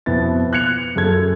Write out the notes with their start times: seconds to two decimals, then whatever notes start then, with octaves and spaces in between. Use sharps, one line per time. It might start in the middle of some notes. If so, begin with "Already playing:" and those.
0.06 F2 B2 B3 E4 A6
0.53 F#6 G#6 C#7 F7
0.96 F#2 G#4 A4 G#6